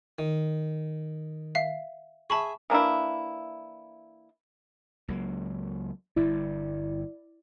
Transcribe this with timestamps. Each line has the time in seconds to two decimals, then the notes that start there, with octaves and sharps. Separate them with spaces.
0.19 D#3
1.55 E5 F5 C7
2.30 G#4 E5 A5 B5 C#6
2.70 E3 A#3 D4 E4
5.08 C#2 F#3 A#3
6.16 G1 G2 E4 D5